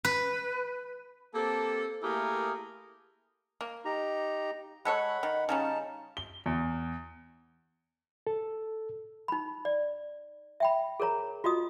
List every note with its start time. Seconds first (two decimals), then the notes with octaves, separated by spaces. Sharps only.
0.05 B4
1.35 A#3 C4 G4 A4
2.03 A3 A#3 E4 G4 G#4 A#4
3.61 A#3
3.85 D#4 G4 A#5
4.85 G#3 A4 C#5 F#5 B5
5.23 D#3
5.49 C#3 G3 C#4 D#4 A5
6.17 G7
6.46 E2
8.27 A4
9.28 D#4 B5
9.65 D5
10.60 E5 G5 B5
11.00 G#4 A#4 C#5 A#5
11.44 F4 F#4 D#5 D#6